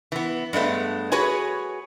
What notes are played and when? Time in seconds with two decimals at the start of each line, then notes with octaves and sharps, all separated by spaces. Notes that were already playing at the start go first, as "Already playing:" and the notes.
0.12 E3 B3
0.53 G2 G#3 A3 B3
1.12 F#4 G#4 B4 C#5 G#5